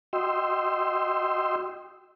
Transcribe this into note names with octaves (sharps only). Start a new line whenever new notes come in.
F#4 D#5 G5 C6 E6